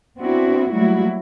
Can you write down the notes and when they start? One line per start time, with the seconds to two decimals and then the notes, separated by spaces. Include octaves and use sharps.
0.18 B3 C4 D4 E4 F#4
0.73 F#3 G3 A3 A#3 E4 F#4